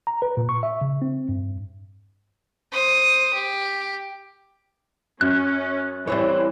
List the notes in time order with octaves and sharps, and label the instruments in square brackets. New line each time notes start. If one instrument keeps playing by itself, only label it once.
[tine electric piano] A#5
B4
A#2
C#6
E5
C#3
C4
G2
[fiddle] C5 D#6
G4
[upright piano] F#2 [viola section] C#4 [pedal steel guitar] F#6
[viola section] E3 [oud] G3 C4 C#5